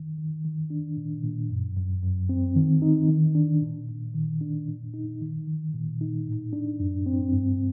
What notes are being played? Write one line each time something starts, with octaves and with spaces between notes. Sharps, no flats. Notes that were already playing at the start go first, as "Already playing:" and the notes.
Already playing: D#3
D#3
D#3
D4
A#2
A#2
F#2
F#2
F#2
C4
D#3
D#4
D#3
D4
A#2
A#2
D#3
D4
A#2
D#4
D#3
D#3
A#2
D#4
A2
D4
F#2
C4
G2